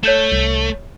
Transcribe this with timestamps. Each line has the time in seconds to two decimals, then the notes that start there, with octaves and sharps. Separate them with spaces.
0.03 A3 C#5 G6 E7
0.32 C2